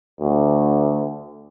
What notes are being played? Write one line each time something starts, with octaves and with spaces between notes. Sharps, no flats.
D2